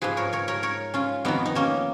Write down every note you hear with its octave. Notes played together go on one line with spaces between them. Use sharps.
G#2 F3 G#4 B4
A#4 C#5
A#4 C#5
A#4 C#5
A#4 C#5
C#4 F4
F2 D#3 B3 D#4
D#4
A#3 C#4